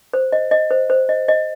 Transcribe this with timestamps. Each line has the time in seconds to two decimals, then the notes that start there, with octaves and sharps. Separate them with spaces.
0.13 C5
0.32 D#5
0.51 D#5
0.71 C5
0.90 C5
1.09 D#5
1.28 D#5